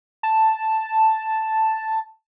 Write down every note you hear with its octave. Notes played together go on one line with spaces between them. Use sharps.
A5